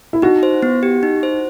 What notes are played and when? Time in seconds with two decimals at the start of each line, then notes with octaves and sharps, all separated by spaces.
0.13 E4
0.22 D#4 F#4
0.43 C5
0.63 B3
0.83 G4
1.03 D#4
1.23 C5